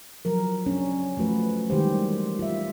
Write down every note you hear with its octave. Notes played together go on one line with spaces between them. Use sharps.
F3 F#3 A#4
C#4 D4
F3 A3 F#4 B4
D#3 E3 G3 G#3 G4 C5
F4 E5